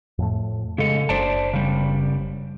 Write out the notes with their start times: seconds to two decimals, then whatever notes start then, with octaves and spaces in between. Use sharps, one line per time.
0.18 F2 A2 A3
0.78 C#3 G#3 A4
1.09 F#1 D4 C5 D5 A5
1.53 C#3 G3